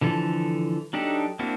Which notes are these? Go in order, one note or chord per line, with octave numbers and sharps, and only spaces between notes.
D3 E3 F3 A4
F#3 D4 D#4 G4 A4
A#3 C4 D4 E4 F#4